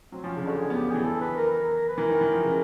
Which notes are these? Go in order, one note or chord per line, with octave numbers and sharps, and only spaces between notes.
F#3 C4
F3 C#4
C#3 D4
D3 F#4
G#4
B3 G4
E3 G#4
A4
B4
A#4
A#4
B4
E3 A#4
D#3
E3
F3
C#3